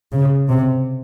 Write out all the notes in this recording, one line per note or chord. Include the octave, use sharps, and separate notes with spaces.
C#3
C3